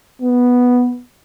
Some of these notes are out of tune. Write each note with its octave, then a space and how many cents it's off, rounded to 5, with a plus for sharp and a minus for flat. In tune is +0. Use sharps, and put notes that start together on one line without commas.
B3 -5